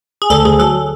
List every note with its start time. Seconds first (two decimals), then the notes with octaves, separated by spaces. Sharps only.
0.22 G#4
0.30 D2 A4
0.45 D2 G#4
0.59 F#3 A4